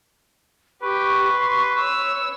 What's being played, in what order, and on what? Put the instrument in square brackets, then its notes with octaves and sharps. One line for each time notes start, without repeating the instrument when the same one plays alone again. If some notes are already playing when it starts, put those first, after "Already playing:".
[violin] G4 [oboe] B4 [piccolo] C#6
[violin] C6
C#5 E6